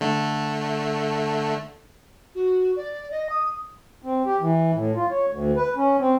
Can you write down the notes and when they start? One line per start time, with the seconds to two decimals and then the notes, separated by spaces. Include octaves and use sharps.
0.01 D3 A3
2.35 F#4
2.76 D5
3.11 D#5
3.30 D#6
4.03 C4
4.26 G4
4.40 E3
4.73 A2
4.95 F4
5.10 C#5
5.30 D2
5.57 B4
5.77 C#4
6.00 C4